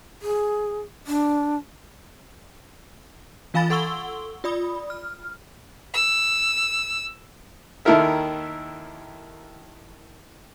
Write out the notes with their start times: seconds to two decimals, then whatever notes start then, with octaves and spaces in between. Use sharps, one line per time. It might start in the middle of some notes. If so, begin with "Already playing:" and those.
0.22 G#4
1.07 D4
3.54 E3 F4 F5 G#5 B5 A6
3.70 A4 F#5 C6 C#6 E6 G7
4.44 F4 D5 B5 D#6
4.90 F6
5.94 E6
7.85 D#2 D#3 E4 A4 A#4 E5